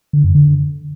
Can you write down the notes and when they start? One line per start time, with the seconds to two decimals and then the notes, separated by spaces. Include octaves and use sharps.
0.13 D3
0.24 F#2
0.35 D3